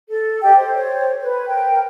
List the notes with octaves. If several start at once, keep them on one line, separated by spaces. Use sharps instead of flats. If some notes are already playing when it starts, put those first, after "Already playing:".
A4
G4 D#5 G5
C5
C5 C#5
B4
A#4 G5